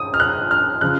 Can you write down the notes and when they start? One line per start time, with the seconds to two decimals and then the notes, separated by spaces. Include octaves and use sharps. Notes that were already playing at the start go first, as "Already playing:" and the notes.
Already playing: D#6
0.14 F6
0.20 F#6
0.51 F6
0.81 C#3 F3 F#6